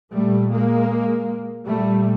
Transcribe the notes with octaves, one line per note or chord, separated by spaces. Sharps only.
A#2 G3 A3
G#3 A#3
A#2 G3 A3